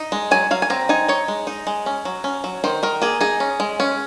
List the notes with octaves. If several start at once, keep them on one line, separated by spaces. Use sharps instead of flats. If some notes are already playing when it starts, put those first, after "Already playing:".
Already playing: D#4
G#3
F#3 G#5
F#3 F5
G#5
C4 A#5
D#4 G#5
D#4 C#5
G#3
D#4
G#3
C#4
F#3
C#4
F#3
D#3 C5
D#3 A#4
A#3 G#4
D#4 G#4
C#4
G#3
C#4